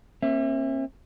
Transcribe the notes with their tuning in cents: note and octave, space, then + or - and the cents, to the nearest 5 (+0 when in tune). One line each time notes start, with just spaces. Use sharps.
A#3 +15 C#4 -45 E5 +0